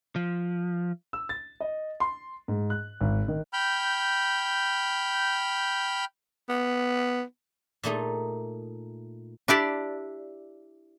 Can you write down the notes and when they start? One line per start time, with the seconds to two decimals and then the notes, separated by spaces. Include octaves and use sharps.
0.16 F3
1.13 E6
1.29 A6
1.60 D#5
2.00 C6
2.48 G#2
2.70 F#6
3.01 G#1
3.28 D#3
3.53 G5 B5 F6 G6
6.49 B3
7.83 A#2 A3 D#4 G#4
9.48 D4 E4 G4 D5